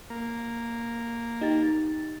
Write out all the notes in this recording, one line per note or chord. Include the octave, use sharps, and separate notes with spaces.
A#3
D#4 G4 A6